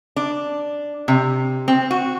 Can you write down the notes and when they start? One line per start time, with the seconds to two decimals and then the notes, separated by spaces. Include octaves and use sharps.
0.16 D4
1.08 C3
1.68 C4
1.91 F#4